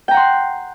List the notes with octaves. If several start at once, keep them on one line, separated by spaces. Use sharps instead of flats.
F#5 G5 A#5 C6